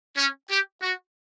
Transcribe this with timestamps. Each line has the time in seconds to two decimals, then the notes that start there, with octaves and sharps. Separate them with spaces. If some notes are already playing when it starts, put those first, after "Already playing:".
0.18 C#4
0.51 G4
0.82 F#4